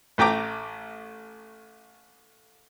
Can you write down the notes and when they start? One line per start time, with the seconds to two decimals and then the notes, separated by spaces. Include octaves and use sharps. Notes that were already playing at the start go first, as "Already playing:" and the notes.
0.18 A1 A3 G5 A#5 D6